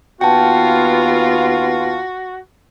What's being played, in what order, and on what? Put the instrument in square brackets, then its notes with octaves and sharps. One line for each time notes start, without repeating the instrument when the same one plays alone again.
[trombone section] D#2 B3 [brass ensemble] F4 [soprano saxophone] F#4 [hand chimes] G5 A5